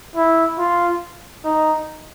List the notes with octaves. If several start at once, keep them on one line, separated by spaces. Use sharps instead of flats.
E4
F4
D#4